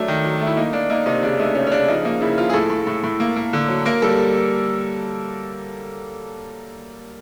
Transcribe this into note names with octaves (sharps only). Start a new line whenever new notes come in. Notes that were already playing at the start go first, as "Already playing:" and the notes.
Already playing: F#3 A3 D4
D#3
F#3
A3
E4
A#3 D#4
A#3 D4
A#3 D#4
C3 D#4
C#3 D4
A3 D#4
C#3 C#4
C#4
C#3 D4
F3 D#4
A#3 D#4
C#3 E4
F3 F4
G#4
A2 A4
A2
A2
A2
A#3
A#3
D3
F#3
A#3 A#4
G3 A4